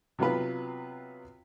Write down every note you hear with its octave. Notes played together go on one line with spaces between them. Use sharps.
C3 F#3 B3 F4 B4